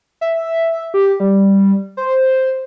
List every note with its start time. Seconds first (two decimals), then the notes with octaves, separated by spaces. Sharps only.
0.21 E5
0.94 G4
1.20 G3
1.97 C5